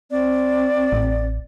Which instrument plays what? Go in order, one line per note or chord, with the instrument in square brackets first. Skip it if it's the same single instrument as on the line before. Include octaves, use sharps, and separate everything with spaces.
[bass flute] C4 [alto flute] D5
[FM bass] A1